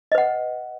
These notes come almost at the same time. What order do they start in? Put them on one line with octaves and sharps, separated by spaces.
D#5 B4 F#5